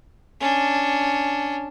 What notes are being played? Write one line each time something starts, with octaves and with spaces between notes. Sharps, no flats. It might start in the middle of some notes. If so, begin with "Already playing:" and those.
C#4 D4